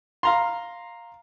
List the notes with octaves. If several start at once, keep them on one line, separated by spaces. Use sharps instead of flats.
F5 A#5 C6